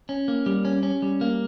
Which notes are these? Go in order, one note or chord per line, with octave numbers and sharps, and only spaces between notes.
C#4
A#3
G3
C#4
C#4
G3
A#3